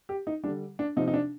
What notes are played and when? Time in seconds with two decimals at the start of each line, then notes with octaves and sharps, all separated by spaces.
0.09 G4
0.27 D#4
0.44 G3 D4
0.48 D3
0.79 D4
0.96 C3 F3 D#4
1.08 D#4
1.14 D4